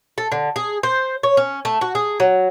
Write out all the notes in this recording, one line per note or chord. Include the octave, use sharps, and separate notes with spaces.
A4
D3
G#4
C5
C#5
C#4
A3
F#4
G#4
F#3